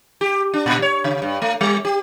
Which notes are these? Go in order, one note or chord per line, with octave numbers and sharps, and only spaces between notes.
G4
D4
A#2
C#5
C#3
G2
A3
G3
G4